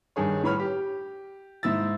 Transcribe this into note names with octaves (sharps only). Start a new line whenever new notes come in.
G2 D#3 G#4 C#5
A2 B4 C#5 B5 F6
G4
G#2 E4 E6 A6